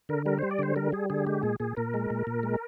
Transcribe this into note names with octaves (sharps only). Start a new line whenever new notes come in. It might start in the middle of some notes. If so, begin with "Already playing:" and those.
D3 A#4
G3 A#4
G3 C5
D5
D3 C5
G3 A#4
G3 G#4
D3 G#4
G#3 G4
A#2 G#4
A#2 G#4
A#2 A#4
G#3
A#2
A#2
G#3